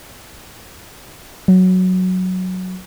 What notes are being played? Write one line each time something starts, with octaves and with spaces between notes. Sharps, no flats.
F#3